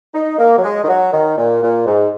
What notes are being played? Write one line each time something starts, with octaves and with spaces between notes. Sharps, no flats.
D#4
A#3
F#3
G#3
D#3
F#3
D#3
A#2
A#2
G#2